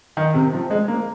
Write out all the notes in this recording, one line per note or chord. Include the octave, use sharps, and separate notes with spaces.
D#3
C3
F3
G#3
A#3